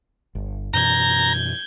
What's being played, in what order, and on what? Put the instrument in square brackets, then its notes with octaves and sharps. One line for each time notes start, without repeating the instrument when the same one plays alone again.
[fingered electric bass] G1
[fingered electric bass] F#2 B2 E3 [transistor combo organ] A#5 [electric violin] G6 G#6